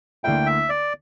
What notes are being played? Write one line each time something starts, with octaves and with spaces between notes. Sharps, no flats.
D2 D3 A#3 E4 G5
E5
D5